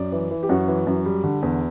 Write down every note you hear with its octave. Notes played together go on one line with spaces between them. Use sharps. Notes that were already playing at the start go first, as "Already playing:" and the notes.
Already playing: F#2 D5
E3
E3
G4
F#2 F#4
E3
F#2
G3
D3
E2